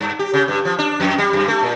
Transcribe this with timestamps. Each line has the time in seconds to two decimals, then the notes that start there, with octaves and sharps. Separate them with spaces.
0.01 G2
0.19 G4
0.34 C#3
0.48 G2
0.65 F3
0.79 D4
1.00 F2
1.18 G3
1.33 F#2
1.48 A3
1.63 A#2